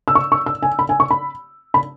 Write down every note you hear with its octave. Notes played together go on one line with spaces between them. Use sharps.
E6
C#6
C#6
E6
G#5
B5
G#5
C#6
B5
B5